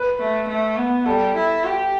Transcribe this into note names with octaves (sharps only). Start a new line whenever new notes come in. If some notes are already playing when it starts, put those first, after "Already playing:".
Already playing: B4
A3
A3
B3
G3 A4
E4
G4